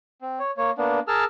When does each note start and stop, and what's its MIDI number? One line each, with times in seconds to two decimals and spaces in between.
0.22 0.39 60
0.39 0.51 73
0.57 0.71 58
0.57 0.71 73
0.78 1.00 58
0.78 1.00 59
0.78 1.00 62
1.08 1.25 68
1.08 1.25 70
1.08 1.25 81
1.08 1.25 88
1.08 1.25 89